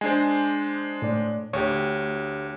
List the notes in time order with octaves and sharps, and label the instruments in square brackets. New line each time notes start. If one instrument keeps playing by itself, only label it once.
[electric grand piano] G#3 D4 C5 [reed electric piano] G#5
[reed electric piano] A2 D5
[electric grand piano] D2 [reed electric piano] G4 C#5